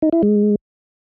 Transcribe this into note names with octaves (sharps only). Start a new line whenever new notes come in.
D#4
E4
G#3